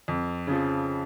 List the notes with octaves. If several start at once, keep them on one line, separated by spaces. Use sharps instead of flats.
F2
C#3 F3